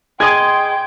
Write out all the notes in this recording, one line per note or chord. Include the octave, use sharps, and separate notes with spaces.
G#4 D#5 G5 C6 D6 G#6